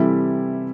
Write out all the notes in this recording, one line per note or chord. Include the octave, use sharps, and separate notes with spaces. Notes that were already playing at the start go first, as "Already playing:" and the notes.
Already playing: C3 E3 G3 E4 A4